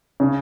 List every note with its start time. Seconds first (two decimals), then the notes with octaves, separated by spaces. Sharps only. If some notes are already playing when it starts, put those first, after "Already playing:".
0.20 C#3